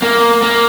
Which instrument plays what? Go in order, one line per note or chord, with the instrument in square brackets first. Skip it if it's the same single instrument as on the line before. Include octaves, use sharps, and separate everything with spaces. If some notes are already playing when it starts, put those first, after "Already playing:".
[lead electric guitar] A#3
A#3